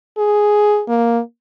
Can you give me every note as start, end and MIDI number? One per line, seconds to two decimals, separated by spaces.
0.18 0.82 68
0.88 1.20 58